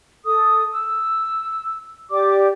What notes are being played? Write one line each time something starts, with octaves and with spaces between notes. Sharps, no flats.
A4 D#6
E6
G4 D5 D6